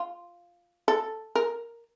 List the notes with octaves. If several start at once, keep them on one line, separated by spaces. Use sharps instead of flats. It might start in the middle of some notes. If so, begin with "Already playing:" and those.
Already playing: F4
A4
A#4